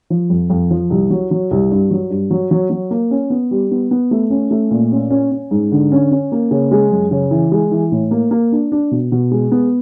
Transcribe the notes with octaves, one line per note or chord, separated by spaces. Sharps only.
F3
F2
F2
F3
C2
F#3
F#3
C2
G2
F#3
G2
F#3
F#3
F#3
A#3
C#4
B3
G3
B3
B3
A3
C#4
A3
A#2
C#4
C#4
C#4
G#2
D3
C#4
C#4
A#3
C#3
G#3
F#2
C#3
E3
G#3
E3
A2
A#3
A#3
D4
D4
B2
B2
G#3
B3